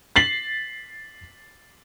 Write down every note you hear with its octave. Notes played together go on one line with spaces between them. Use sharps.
A6 B6 C7 F#7